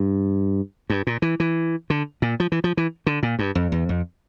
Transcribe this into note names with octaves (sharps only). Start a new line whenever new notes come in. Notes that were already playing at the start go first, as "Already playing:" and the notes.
Already playing: G2
G2
A#2
E3
E3
D3
A#2
F3
E3
F3
E3
D3
A#2
G2
F2
E2
F2